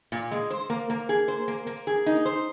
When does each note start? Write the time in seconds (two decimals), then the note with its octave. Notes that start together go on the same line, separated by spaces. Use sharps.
0.12 A#2
0.31 G#3
0.50 C5
0.70 A#3
0.90 A#3
1.09 G#4
1.28 C5
1.48 A#3
1.67 A#3
1.87 G#4
2.06 D#4
2.26 C5